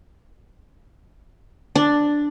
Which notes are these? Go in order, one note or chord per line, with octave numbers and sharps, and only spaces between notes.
D4